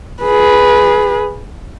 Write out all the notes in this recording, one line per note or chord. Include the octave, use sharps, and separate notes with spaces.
G#4 B4